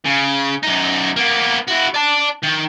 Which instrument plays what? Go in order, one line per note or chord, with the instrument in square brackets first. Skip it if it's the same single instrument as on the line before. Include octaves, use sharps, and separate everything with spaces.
[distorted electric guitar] C#3
F#2 D#4
A#3 B3
E4 F#4
D5 A5
D#3